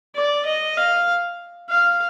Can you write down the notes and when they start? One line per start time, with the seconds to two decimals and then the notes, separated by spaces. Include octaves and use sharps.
0.15 D5
0.46 D#5
0.77 F5
1.70 F5